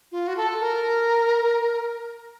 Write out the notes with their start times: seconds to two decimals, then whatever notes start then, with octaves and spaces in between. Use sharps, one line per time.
0.12 F4
0.28 F#4
0.37 A4
0.60 A#4